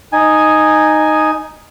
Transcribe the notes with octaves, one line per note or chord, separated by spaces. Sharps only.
D#4 G#5